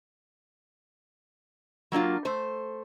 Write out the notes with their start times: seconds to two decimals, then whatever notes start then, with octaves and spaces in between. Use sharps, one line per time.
1.92 F#3 A#3 D4 F4
2.25 A3 C5